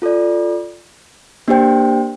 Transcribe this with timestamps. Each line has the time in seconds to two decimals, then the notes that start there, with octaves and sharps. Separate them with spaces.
0.02 F4 A4 D5
1.48 A#3 D4 G4 C5 G5